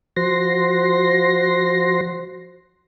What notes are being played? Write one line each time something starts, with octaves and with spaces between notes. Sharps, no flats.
F3 F#4 C5 C6 A#6